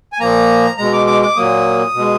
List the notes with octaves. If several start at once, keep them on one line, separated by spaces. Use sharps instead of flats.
G#5
A#2 F3 A#3 A#5
B2 G#3 A#5
D6
D6
D6
A#2 F#3 A#3 D#6
B2 G#3